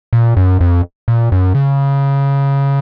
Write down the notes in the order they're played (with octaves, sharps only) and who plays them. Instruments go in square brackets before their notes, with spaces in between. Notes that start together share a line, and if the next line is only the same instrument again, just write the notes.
[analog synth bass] A#2
F#2
F2
A#2
F#2
C#3